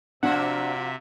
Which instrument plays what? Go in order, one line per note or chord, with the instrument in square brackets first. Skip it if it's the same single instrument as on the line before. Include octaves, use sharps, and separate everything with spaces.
[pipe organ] C3 E5 [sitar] F3 A#3 F#4 [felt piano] D4 [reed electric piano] F#5